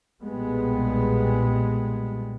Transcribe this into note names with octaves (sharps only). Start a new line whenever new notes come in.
B1 A#2 G3 G#3 B3